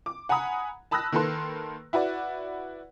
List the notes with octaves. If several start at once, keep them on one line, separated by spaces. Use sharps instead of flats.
D6
F#5 G#5 A#5 B5 D#6
A5 B5 D#6 E6 F#6 A#6
D#3 A#3 A4 B4 C6
E4 F#4 B4 D5